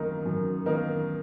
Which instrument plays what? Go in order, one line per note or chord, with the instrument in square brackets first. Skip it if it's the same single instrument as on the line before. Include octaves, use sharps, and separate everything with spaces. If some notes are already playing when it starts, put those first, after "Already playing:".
Already playing: [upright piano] F#2 D#3 A#3 D#4 A#4
F#2
D#3 A#3 D#4 A#4